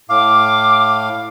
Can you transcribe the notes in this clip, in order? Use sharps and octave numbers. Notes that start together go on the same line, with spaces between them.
A2 F5 D6